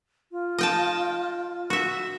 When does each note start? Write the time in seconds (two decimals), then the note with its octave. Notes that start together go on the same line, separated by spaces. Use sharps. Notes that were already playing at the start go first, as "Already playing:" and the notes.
0.32 F4
0.58 D#5 G5 A5
1.70 F#4 E5